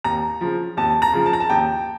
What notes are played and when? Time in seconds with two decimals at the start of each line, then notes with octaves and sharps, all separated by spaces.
0.04 D#2 A#5
0.41 C#3 F3
0.77 D#2 A5
1.02 A#5
1.13 C#3 F3
1.26 A5
1.33 A#5
1.40 A5
1.50 D#2 G5